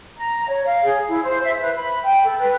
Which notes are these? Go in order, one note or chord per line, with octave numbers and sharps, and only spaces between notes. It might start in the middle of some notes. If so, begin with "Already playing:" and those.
A#5
C#5
F5
G#4
E4
C5
E5
B4
B5
G5
A4
B4